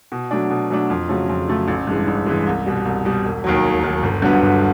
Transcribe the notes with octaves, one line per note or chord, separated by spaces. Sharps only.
B2
F#3 A3 D4
B2
F#3 A3 D4
F2
C#3 F#3 A3
F2
C#3 F#3 A3
A1
G2 E3 G#3
A1
G2 E3 G#3
C2
B2 G3
C2
B2 G3
E1
D#2 D#3 F#3
E1
D#2 D#3 F#3
G1
G2 D3 F#3 B3
G1